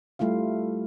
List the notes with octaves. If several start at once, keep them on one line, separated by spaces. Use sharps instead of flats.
G3 A3 E4 F4 F5